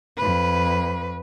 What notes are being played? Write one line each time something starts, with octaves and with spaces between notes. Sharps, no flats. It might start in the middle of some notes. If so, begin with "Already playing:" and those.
F2 B4